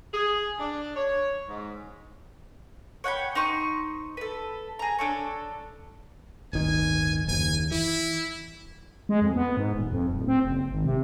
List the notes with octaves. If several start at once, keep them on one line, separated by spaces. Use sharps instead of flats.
G#4
D4
C#5
G#2
C#5 F#5 G5 B5
D#4 C5 C#6 D#6
A4 B4
G#4 A#5
D4 A4 C#5
D1 G1 D#3 G#5
F#1 D#2 G#5
E3 E4
G#3
F2
B3
G#2
D#1
F2
D1
C4
F#1
G#1
C3